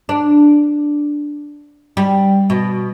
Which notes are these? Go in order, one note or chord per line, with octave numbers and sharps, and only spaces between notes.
D4
G3
B2